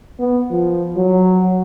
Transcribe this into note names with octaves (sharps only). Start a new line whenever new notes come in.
B3
F3
F#3